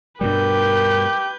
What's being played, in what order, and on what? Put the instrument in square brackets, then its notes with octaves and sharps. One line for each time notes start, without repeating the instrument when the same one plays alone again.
[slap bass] G2 B2 G3 [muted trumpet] G4 [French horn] A#4 [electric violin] B4 G6